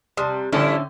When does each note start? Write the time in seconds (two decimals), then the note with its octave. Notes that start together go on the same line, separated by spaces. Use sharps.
0.17 C3 G3 A5 C6 D#6
0.52 A2 D3 F3 G3 A3 C#4 E4 A4